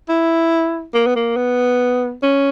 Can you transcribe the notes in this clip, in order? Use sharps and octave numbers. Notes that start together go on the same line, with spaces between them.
E4
A#3
B3
A#3
B3
C#4